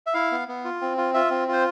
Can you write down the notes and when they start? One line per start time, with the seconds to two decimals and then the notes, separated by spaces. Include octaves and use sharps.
0.07 E5
0.14 E4 F5
0.32 B3
0.48 B3
0.64 F4
0.81 C4
0.97 F4
1.14 F4 E5
1.31 C4
1.48 F4 C5